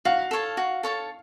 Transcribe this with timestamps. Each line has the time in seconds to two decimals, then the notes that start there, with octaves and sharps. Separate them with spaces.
0.05 F#4 F5
0.31 A4 C#5 A5
0.57 F#4
0.83 A4 C#5 A5